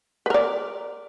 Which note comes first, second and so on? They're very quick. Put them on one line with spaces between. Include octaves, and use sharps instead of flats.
B4 A#4 D5